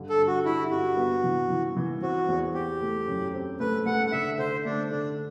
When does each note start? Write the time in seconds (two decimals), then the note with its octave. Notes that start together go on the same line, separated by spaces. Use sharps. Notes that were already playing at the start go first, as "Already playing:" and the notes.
Already playing: G2 D3
0.10 A4
0.19 G2
0.27 F#4
0.45 G3 E4
0.71 G2 F#4
0.97 B3
1.24 E3
1.50 E3
1.76 E3
2.02 C4 F#4
2.28 E2
2.54 C4 G4
2.81 A3
3.08 F#2
3.33 C4
3.60 A3 B4
3.86 A3 F#5
4.06 F#5
4.12 D3 E5
4.38 D3 C5
4.65 A3 D4
4.91 D3 D4